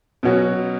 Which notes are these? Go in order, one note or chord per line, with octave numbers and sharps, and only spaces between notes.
B2 F#3 C#4 F#4